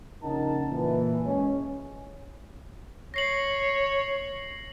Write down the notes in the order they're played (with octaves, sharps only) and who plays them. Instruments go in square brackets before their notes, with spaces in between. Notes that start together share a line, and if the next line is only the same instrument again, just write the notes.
[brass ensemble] A#1 C#3 D#4 A#4 F#5 A5
A#2 E3
G#3 C#4
[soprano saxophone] C#5 [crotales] A#6 C7 F#7